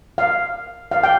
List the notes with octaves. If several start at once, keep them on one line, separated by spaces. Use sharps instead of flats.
F5
F5
G5